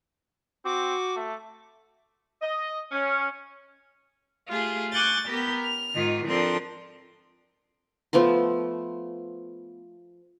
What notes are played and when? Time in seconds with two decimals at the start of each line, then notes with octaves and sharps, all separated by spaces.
0.65 C4 F#4 D6
1.16 A3
2.41 D#5
2.92 C#4
4.48 A3 F4 G4 G#4
4.92 G#5 C#6 D6 F#6 G6 A6
5.25 B3 G4 A#4 B5 G6
5.63 F6
5.95 G#2 D#3 F4
6.27 F3 C4 D4 A4 A#4 C6
8.13 F3 A3 B3 C6